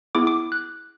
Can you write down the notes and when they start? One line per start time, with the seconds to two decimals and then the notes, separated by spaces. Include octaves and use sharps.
0.15 B3 E4 G#4 D6
0.27 D6
0.52 F#6